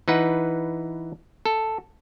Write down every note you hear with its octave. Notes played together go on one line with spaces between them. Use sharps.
E3 D#4 B4 F#5
A4